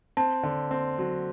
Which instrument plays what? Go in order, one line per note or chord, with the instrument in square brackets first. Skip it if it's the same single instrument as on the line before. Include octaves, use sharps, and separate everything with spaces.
[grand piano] C4 [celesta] A5
[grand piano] D3
C4
F#3